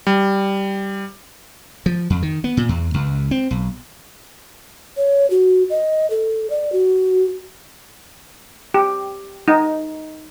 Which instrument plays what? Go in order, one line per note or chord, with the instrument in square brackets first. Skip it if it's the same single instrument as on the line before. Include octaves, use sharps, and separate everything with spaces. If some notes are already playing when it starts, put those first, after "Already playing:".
[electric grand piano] G3
[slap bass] F3
F2
D#3
B3
A#2
E2
C#2
C4
B1
[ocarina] C#5
F#4
D#5
A4
D5
F#4
[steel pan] G4
D#4